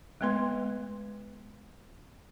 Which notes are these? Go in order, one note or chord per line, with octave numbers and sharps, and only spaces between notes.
G#3 A3 B3 B4 C6